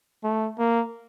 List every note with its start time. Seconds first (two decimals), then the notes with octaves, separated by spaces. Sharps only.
0.24 A3
0.59 A#3